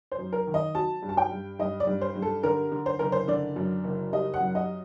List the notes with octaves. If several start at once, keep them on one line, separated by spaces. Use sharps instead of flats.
C5
F#2
A#4
D#3
D#5
F#3 A5
G2
A5
G5
G2
G2 D#5
D5
G2
C5
G2
A4
D3 A#4
D3
C5
F#1 A#4
C5
D3 D5
F#2
F#1
G3 D#5
F#5
F#2
D#5